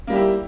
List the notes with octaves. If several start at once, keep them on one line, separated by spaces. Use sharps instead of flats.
G3 A#3 E4 G4